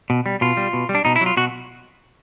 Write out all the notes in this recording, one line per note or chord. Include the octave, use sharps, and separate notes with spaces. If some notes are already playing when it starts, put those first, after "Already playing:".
B2
G3
B2 F4
G3
B2
G3
D4
B2 D#4
E4
F#3
F4
B2 F#4